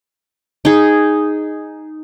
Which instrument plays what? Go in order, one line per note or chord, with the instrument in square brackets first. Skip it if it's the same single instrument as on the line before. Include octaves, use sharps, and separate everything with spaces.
[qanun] D#4 G#4